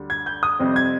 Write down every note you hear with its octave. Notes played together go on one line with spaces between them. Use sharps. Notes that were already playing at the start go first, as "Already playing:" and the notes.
Already playing: D2 D3 G3
G#6
G6
D#6
F2 C3 G3 C4
G#6